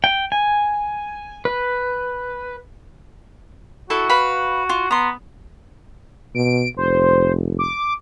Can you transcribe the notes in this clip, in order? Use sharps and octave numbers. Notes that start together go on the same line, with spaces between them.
G5
G#5
B4
E4 F#4 A4 A5
B4 F5 B5
F4
B3 A#5 C6
B2 D7
F1 C5
D6